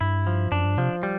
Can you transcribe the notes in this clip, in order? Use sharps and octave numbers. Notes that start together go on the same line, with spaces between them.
G2 E4
F3
F#2 D4
G2
C3 F3
G3